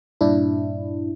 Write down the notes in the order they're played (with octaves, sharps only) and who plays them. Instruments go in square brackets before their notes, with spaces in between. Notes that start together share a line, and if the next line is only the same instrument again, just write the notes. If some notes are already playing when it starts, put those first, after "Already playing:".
[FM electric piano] G2 A#2 D4 E4